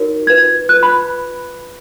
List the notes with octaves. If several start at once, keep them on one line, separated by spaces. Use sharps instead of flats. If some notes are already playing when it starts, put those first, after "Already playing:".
Already playing: D#4 F#4 A#4 C#5
F4 B4 G#6
F4 B4 F#6
B5